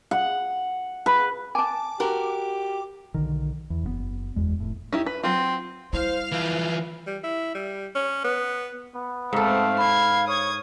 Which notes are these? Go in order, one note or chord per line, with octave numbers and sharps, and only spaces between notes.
F#5
B4
G#5 A5 D6
F#4 G4 A#4
B1 D3 D#3
E2
F#1 B2 B3
F#1 E2 G#3
F1 A2
D#4 E4 G4
B4
F#3 C4 F4
G3 E4 C5 F5
E3 F3 B4
G3
E4
G3
C#4
B3
B3
G#2 A3 C4 A4 F5
B5 G#6 C7
C#5 D#6 G#6